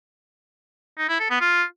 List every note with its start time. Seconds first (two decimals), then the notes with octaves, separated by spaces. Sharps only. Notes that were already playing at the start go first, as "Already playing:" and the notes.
0.98 D#4
1.09 E4
1.20 A4
1.30 B3
1.41 F4